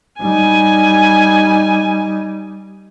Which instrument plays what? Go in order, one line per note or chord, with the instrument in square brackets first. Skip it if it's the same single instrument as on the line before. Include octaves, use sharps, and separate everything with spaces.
[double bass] G3 D#4 [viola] G#5